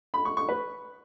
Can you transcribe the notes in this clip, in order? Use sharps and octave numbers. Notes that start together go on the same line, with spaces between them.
B5
C#6
C#6
B4